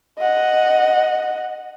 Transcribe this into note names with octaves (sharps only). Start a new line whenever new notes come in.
D#5 F#5